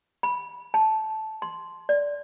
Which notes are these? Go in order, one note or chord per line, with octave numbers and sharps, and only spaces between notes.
B5
A5
C6
D5